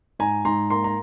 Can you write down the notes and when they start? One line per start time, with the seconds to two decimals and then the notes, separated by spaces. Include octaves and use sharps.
0.19 G#2 G#5 A#5
0.45 G#2 A#5 C6
0.70 A#3 A#5 C6
0.84 A#5